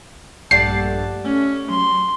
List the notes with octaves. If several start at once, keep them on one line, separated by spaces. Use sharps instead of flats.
A#1 G2 A3 G4 D5 F#5 A5 C7
A3 C#4
F#3 C6